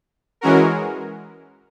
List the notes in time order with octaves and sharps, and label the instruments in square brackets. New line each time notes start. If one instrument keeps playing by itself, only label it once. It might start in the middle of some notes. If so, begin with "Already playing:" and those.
[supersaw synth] E3 G#3 C#4 F#4 A#4